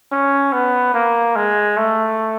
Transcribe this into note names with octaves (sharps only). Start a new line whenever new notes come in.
C#4
B3
A#3
G#3
A3